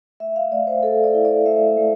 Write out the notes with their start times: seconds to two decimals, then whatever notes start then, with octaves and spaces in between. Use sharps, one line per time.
0.20 A3 E5
0.36 F5
0.52 A3 D5
0.67 C5
0.83 A3 A4
1.04 D5
1.14 E4
1.25 D5
1.46 A3 E5
1.77 A3